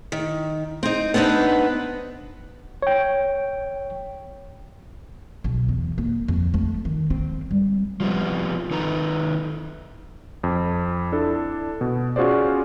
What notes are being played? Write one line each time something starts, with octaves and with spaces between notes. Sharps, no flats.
D#3
C4 D#4
B3 C4 D4 D#4 B4
C#5 G5
B1
E2
A#3
F2
A3
D#3
C4
G3
F3 G3 B3 C4
D#3 D#4 A4 B4 A#5
F2
D4 E4 A4
B2
C#4 F4 F#4 G#4 C5 D5